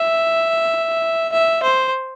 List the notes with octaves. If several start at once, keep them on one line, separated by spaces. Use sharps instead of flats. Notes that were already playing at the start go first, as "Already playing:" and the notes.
Already playing: E5
E5
C5